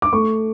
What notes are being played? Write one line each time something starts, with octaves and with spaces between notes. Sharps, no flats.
D6
A3 C#6